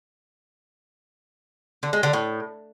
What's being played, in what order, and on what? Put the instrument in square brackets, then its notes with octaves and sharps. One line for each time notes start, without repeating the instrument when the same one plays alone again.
[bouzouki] D3
G#3
D3
A2